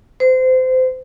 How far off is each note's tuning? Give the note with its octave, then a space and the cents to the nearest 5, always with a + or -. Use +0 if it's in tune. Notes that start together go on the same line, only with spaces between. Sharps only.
C5 -25